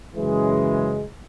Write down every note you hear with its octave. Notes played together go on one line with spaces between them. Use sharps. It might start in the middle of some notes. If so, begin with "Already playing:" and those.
F#2 C#3 E3 F#3 G#3